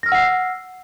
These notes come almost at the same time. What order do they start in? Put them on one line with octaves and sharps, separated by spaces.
A#6 F6 E6 F#5 C7